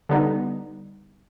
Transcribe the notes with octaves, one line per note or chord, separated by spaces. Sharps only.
D3 G3 B3 D#4